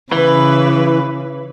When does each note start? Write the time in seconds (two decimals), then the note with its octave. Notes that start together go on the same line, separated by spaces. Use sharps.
0.12 C#3 E3 B4